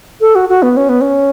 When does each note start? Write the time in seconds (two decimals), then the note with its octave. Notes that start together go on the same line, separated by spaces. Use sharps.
0.21 A4
0.35 F#4
0.49 F#4
0.63 B3
0.77 C#4
0.89 B3
1.01 C#4